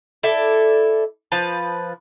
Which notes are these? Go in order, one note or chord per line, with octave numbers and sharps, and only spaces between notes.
E4 A4 D5
F3 B4 A5